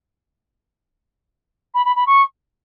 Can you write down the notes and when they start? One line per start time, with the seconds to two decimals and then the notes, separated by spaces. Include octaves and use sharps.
1.74 B5
1.85 B5
1.95 B5
2.06 C#6